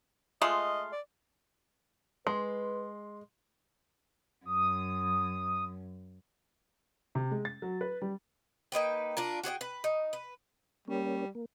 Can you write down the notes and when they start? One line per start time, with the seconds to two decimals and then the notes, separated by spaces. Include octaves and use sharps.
0.42 G#3 A3 F4 D#5
0.92 D5
2.27 G#3 B4 C6
4.46 F#2 D#6
7.15 C3
7.31 G#3
7.45 A6
7.62 F#3
7.81 B4
8.02 G3
8.72 A#3 D#4 B4 G5
9.17 D4 F4 A#4
9.43 F#4 G#4 C#5 G5
9.61 B4
9.84 D#4
10.13 B4
10.88 G3 A#3 C#4
11.35 A#3